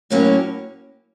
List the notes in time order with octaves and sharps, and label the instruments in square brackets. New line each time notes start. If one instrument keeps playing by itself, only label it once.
[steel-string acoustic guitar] A2 F#3 A#3 C#4